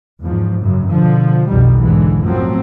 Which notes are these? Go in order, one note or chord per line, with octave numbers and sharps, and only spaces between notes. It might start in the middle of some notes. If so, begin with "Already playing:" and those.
E2 G#2 F3
F#2 C#3
B2 D3 F3
B1 F2 B2 D#3 G3
D#2 G#2 D3 E3
F#2 A2 F3 F#3 C4